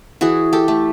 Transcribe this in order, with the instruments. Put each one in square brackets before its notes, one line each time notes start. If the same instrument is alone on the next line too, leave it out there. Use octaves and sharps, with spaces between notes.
[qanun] E3 F#4 G#4
G4 A4
A3